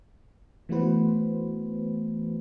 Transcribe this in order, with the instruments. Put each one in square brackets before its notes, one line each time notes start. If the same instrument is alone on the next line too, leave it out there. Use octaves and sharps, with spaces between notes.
[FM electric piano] E3 A3 B3 F#4 B4 C5